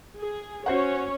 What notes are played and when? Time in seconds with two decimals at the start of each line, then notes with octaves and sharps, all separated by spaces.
0.17 G#4
0.66 C#4 F#4 C5 C#5 F#5